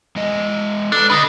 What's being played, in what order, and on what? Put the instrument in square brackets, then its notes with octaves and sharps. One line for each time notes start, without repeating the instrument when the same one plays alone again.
[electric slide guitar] G#3 B3 D#5
[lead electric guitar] D4 [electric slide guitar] A4 B4
[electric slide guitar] D3 [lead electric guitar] B4 D#5